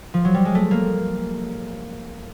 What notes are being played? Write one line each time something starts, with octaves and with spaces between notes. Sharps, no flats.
F3
F#3
G3
G#3
A3
A#3